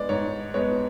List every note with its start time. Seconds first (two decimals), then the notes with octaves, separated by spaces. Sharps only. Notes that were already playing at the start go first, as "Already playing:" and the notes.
Already playing: G#3 B3 D5
0.09 G#2 C#5
0.54 G#3 B3 C#5